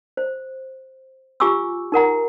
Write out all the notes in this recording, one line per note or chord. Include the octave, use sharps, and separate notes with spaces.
C5
F4 G4 G#5 C#6 D6 E6
D#4 A#4 F#5 A#5